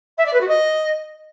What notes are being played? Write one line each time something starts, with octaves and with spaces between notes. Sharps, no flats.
E5
D5
B4
F#4
D#5